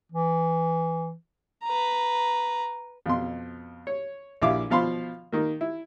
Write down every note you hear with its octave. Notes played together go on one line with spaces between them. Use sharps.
E3
B4 A#5
F2 B2 C6
C#5
A#1 E4 E5 F5 D6
B2 F3 F5 B5 C6
D#3 A#3
E4